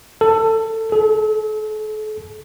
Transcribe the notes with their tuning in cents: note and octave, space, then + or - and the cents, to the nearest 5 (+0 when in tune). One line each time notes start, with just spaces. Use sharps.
A4 +20
A4 -40